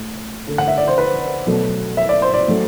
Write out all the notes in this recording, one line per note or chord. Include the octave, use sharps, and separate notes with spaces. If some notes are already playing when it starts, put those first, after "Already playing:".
Already playing: A2
D3 A3
F#5
E5
D5
C5
B4
B2 F#3 A3
E5
D5
C5
D5
A2 F#3 A3